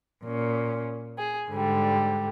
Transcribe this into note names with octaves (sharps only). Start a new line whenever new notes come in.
A#2 C#4
G#4
G#2 D3 G3